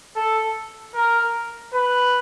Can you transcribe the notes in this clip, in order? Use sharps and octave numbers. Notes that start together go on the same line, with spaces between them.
A4
A#4
B4